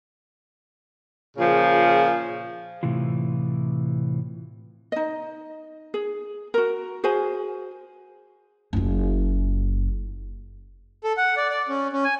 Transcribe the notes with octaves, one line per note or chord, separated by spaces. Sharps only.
A#2 C#3 F3 G#4
A2 C3 E3 F4
D#4 D#5
G#4
F#4 A#4
F#4 G#4 C5 G#5
F#1 F4
A4
F#5
D5
D5
C#4
C#4
G#5